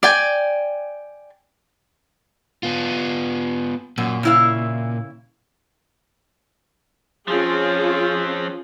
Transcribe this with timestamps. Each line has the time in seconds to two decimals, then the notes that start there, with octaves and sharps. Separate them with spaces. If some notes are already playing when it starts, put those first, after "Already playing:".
0.03 D5 G5 G#5
2.63 B3 F4
3.98 F#2 A#2
4.23 C#3 E4 F5
7.28 F3 C4 C#4 F4 G#4